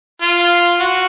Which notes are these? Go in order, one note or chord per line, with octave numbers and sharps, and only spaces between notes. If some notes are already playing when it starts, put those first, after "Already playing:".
F4
F#4